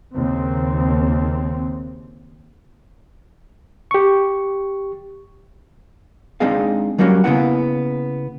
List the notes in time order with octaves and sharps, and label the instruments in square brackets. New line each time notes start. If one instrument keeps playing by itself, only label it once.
[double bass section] D#2 C#3 C4
[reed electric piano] G4 C#6
[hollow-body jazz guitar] G#3 C4 D4 D#4 G#4 F5
F#3 G3 A#3 C#4 F4 F#4
C#3 A#3 B3 E4 F#5